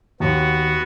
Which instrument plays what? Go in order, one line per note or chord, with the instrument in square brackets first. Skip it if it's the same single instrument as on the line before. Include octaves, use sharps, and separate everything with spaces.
[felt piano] D#2 [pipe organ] B3 F#4